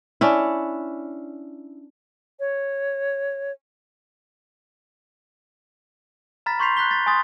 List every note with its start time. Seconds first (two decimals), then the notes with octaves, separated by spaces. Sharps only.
0.21 C#4 D4 E4
2.40 C#5
6.46 A#5 B5 F6 A6 B6
6.59 C6 C#6 G6 B6 C7 F7
6.77 F#6 G6 B6 G7
6.90 G6 A6 B6
7.06 G#5 C6 D#6 A6